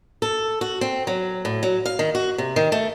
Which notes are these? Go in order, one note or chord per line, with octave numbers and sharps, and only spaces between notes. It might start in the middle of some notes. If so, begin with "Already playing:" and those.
A4
F#4
C4
F#3
A2
F#3
F5
D#3
F#4
C3
D#3
A3